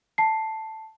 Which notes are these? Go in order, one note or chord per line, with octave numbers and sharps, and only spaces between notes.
A5 C7